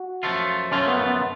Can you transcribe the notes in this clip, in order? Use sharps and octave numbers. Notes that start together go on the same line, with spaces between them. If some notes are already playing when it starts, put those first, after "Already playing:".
Already playing: F#4
F#2 F3 A3 F4
F#2 F3 A3 C#4 F4
B3
B3